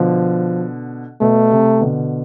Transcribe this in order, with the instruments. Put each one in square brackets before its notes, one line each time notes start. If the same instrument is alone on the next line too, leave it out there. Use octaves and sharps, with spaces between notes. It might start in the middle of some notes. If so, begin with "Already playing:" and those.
Already playing: [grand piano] B2 D3 [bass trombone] F3
[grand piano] B2 [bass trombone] A3
[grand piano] C3
B2 D3